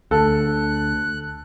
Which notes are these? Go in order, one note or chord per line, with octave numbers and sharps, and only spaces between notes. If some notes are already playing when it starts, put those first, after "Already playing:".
D2 A4 F#6